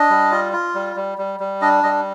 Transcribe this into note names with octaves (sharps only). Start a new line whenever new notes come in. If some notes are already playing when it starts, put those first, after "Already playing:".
Already playing: D4 D#5
G3
F4
F4
G3
G3
G3
G3
D4 D#5
G3 D#5